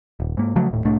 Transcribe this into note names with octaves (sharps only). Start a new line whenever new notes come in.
D#1
G#2 A#3
C#3 F3 F#3 A3
D#1 A2
C2 A2 A3 D4